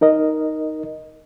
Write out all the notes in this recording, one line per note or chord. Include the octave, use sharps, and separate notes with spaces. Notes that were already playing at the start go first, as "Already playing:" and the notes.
D#4 A#4 D#5